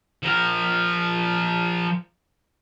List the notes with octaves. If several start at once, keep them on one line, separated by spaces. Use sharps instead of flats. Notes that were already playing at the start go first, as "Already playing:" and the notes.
F3 A#4